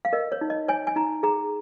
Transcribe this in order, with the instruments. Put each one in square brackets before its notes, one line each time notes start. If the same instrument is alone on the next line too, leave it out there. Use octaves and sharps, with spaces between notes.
[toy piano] F5
A#4 D#5
C#5
D#4
D#5
C#5 G#5
G#5
D#4 A#5
G#4 A#5